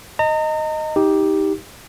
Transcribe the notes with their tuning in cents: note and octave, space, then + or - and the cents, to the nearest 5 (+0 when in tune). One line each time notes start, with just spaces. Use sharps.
D#5 +0 A#5 -35
D#4 +20 G4 +0